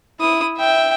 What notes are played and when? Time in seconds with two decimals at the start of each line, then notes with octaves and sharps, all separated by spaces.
0.20 E4 D#6
0.57 E5 G5